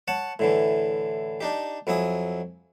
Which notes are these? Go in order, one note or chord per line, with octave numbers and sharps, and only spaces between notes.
C#5 F#5 A5
A2 D3 E3
D4 D#4 G4
F2 F#3 E4 G#5 D#6